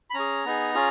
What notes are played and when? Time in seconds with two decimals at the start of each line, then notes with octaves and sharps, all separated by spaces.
0.10 B5
0.14 C#4 G#4 A#5
0.45 B3 D#4 G#4
0.75 C#4 F4 G#4